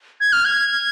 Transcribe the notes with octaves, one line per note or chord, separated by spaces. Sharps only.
G#6
F6
G#6